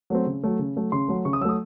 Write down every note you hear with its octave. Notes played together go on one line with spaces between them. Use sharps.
F#3 A3 C4
C#3
F#3 A3
C#3
F#3 A3
C#3 C6
F#3 A3
C#3 C#6
D#6
F#3 A3 D#6 E6